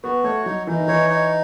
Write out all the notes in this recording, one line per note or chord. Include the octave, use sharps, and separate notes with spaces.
B3 F#4
A3 C#5
F#3 D#4
E3 D#4
D#3
E3 C#5
D#4